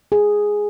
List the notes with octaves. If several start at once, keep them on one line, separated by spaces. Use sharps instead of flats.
G#4